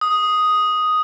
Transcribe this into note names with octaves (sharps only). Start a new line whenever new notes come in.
D#6